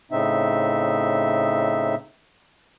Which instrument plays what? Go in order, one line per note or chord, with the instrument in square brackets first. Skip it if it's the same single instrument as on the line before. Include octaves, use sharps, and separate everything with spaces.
[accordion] A2 C#3 C4 D#4 E5